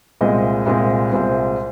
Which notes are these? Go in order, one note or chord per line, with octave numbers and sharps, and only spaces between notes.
C2 A#2 G#3 C4 D#5
C2 A#2 G#3 C4
C2 A#2 G#3 C4 C5